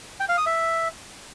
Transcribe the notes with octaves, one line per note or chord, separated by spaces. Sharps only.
G5
F5
D#6
E5